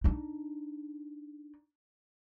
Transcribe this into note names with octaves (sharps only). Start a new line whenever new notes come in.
D4 D#4